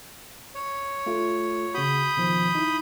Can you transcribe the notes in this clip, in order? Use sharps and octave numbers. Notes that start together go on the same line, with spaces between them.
C#5
A3 F4
C#3 F#4 B5 D#6 G6
B2 D#3 F3
D#4 E4